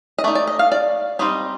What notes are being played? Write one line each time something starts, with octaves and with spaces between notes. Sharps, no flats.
D#5
A3 D#4 D5
D5
D#5
F5
D5
G3 C4 D#4 D#5